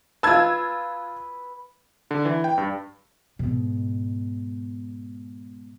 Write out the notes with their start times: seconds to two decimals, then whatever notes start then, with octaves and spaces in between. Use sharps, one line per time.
0.23 F4 B4 A5 E6 G#6
2.11 D3
2.25 E3
2.44 G5
2.58 G2
3.39 G#2 B2